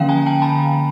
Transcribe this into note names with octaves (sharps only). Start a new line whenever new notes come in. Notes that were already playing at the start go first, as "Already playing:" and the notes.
Already playing: D3 F3 A#3 C#4 F5 G5
G#5 A#5
G5 A5
A5 B5